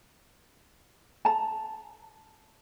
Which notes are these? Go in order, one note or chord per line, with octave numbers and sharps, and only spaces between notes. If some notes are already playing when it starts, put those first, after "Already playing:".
A5 A#5